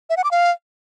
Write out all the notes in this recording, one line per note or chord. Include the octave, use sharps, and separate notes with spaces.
E5
F#5
D6
F5